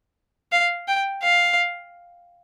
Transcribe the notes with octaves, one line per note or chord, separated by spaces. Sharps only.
F5
G5
F5